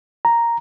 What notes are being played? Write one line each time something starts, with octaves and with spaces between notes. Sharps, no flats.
A#5